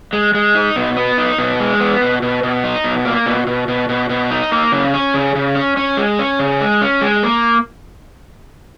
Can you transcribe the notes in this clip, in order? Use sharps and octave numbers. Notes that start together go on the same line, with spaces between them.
G#3
G#3
D#4
B2
B3
D#4
B2
G#3
B3
B2
B2
B2
D#4
B2
A#3
B2
B2
B2
B2
B2
D#4
A#3
C#3
C#4
C#3
C#3
C#4
C#4
G#3
C#4
C#3
G#3
C#4
G#3
A#3